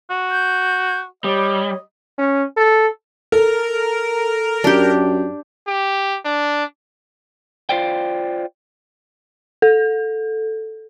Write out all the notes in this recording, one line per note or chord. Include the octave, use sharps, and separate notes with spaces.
F#4
G6
G3 C#5 D#5
C#4
A4
A4 A#4
F#2 D4 G4
G4
D4
F4 C5 D5 G5
A4